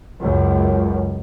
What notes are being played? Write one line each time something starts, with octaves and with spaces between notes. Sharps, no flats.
C#2 F#2